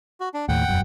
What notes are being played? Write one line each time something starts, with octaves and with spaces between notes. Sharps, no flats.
F#4
D4
D#2 A2 F#5 G5
E1 F#2